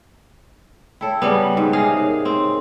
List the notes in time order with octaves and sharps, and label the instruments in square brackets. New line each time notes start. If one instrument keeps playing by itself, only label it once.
[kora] E4 A4 [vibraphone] C#5 G5
[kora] C#3 G3 B3
G#2
C3 G#4 F5
[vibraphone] D#4 A#4 C#5
[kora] C4